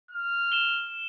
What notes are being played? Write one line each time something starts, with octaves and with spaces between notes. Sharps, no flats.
F6
E7 G7